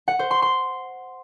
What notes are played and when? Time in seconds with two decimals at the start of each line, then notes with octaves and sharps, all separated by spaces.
0.08 F#5
0.19 C5
0.31 C6
0.42 C6